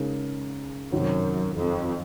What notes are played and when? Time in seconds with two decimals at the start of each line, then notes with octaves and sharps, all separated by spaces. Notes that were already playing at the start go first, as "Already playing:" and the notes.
Already playing: C#3 G#3 D#4 A#4
0.92 F#2 C3 D#3 F#3
1.57 F2